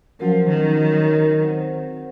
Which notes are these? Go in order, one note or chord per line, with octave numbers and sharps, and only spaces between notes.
F3 F#3 C#4 F#4 A#4
D#3
D#4 F#4 A#4 C#5
C4 F#4 C5 F#5